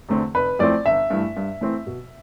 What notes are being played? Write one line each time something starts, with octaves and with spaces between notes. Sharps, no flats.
E2 D3 A3 C4
F1 B4
F2 E3 A3 C4 D5
G1 E5
G2 E3 A3
G2
E3 A3 C4
B2